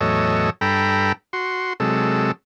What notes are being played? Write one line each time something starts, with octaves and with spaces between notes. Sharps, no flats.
E2 A2 F#3 A4 C#5 D#5
G2 A4 G5 A#5 B5
F#4 C6
C3 F#3 G#3 A4